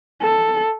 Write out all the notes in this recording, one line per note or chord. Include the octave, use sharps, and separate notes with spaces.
A4